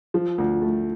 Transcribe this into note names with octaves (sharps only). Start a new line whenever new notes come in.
F3
D2
A3